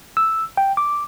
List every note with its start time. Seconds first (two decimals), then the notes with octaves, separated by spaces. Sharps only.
0.17 E6
0.57 G5
0.77 D6